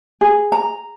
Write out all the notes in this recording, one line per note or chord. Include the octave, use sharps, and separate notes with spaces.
G#4
A#5